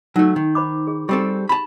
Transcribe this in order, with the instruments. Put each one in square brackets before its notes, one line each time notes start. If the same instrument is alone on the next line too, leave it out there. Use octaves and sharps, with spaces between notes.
[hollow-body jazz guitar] F#3 A3 [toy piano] D#4
[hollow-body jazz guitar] D#3
[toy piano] C5 B5 D6
G#4
[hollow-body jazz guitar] G3 C4 A4 [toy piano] G4
[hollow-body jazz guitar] A5 B5